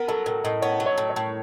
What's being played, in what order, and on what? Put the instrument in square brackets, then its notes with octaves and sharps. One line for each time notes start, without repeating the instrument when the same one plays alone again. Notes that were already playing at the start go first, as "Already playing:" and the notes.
Already playing: [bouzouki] B3 [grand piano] A#4
[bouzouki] F#3 [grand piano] A4
[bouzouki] A2 [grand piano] A#4
[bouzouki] A2 [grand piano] D#5
[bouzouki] B3 [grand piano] C#5
[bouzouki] F#3
[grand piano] C#5
[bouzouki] A2
[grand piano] C#5
[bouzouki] A2